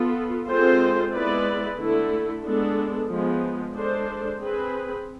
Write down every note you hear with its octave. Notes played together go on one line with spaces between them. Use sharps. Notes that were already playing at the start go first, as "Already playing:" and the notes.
Already playing: B3 F4 A4
G#3 C4 F4 A4 C5
G#3 B3 E4 B4 D5
D3 A3 E4 A4
G#3 B3 D4 A4
F3 G#3 B3
G#3 D4 A4 C5
C4 G#4 B4